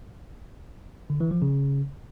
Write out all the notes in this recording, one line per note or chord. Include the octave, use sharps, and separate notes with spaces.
D3
E3
F3
C#3